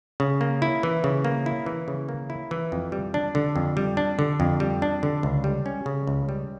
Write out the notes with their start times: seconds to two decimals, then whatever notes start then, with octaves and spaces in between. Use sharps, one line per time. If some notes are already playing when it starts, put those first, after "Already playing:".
0.20 C#3
0.41 A#3
0.62 E4
0.83 E3
1.04 C#3
1.24 A#3
1.46 E4
1.66 E3
1.88 C#3
2.09 A#3
2.30 E4
2.51 E3
2.72 F2
2.92 G3
3.14 D4
3.35 D3
3.56 F2
3.77 G3
3.97 D4
4.19 D3
4.40 F2
4.60 G3
4.82 D4
5.03 D3
5.23 C#2
5.44 G3
5.66 C#4
5.86 C#3
6.07 C#2
6.29 G3